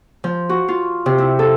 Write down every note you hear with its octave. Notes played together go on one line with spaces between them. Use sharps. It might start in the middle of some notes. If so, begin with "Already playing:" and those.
F3
F#4
F4
C3
E4
A4